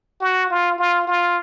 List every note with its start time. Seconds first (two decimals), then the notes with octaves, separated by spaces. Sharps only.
0.21 F#4
0.50 F4
0.79 F4
1.07 F4